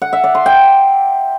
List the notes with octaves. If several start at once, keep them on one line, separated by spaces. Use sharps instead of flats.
F#5
E5
D5
C6
G5